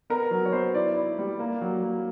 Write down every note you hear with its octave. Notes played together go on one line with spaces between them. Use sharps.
B3 A#4
F#3
C#5
B3 C5
E4 D5
E4
G3
A#3
F#3
A#3